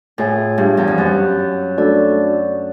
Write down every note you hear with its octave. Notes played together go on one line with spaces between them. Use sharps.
A2 F4 G#4 C#5 E5 G#5
G2
E2
F2
F#2
A3 D4 F#4 A4 D5